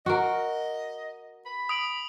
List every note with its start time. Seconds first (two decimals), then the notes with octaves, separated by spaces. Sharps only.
0.06 F#4 A#4 D#5
1.46 B5
1.69 D#6 D7 F#7